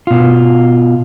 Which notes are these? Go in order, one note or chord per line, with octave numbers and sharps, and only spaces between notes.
B2 F4